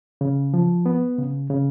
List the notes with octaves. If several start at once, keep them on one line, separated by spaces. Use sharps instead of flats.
C#3
F3
B3
C#3
C#3